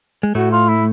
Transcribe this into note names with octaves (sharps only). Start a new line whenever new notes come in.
G#3
A2 A3 F#4
F4
E4